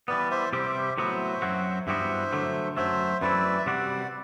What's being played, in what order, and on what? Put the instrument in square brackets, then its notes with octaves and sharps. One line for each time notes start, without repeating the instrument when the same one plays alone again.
[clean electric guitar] E3 G3 B3 [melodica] B4 D5
[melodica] C5 E5
[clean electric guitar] C3 G3 C4 G4 [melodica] C5 E5
[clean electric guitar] A2 F#3 B3 F#4 [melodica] C5 E5
[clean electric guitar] F#2 F#3 C4 F#4
[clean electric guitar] G2 E3 G3 B3 F#4 [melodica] C5 E5
[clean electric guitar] D3 F#3 A3
[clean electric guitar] F#2 F#3 A3 [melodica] C5 E5
[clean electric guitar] F#2 E3 A3 C4 E4 [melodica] B4 D5
[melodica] E5
[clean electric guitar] C3 G3 C4 F#4 [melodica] D5 F#5